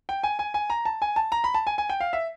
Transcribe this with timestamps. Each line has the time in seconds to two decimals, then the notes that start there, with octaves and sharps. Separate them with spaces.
0.09 G5
0.23 G#5
0.39 G#5
0.54 G#5
0.70 A#5
0.85 A5
1.02 G#5
1.16 A5
1.32 A#5
1.44 B5
1.54 A5
1.67 G#5
1.78 G#5
1.90 G5
2.00 F5
2.13 E5